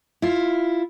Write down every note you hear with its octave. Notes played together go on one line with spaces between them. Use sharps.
E4 F4